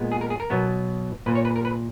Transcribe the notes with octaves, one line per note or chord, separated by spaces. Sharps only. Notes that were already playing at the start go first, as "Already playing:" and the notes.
Already playing: A#2 G#3 B3
G#4
A#4
G#4
A#4
B2 F#3 B3
A#2 A#3 B4
C#5
B4
A#4
B4